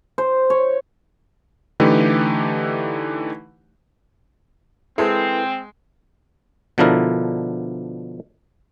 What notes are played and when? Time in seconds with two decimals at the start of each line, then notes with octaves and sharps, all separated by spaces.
0.18 C5
0.50 C#5
1.80 D3 E3 A3 D#4 G4 B4
4.98 G#3 C4 E4 A4 B4
6.78 B2 D3 F3 D4 E4 A#4